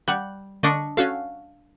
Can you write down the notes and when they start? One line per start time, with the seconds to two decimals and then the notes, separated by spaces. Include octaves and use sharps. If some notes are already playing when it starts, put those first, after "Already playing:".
0.08 G3 F#5 F#6
0.63 D3 D4 D5 D#5 C#6 C#7
0.97 C#4 F#4 A4 F5